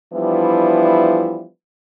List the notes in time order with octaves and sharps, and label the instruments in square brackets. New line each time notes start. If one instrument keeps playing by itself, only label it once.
[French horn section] E3 F3 G3 B3 D4 E4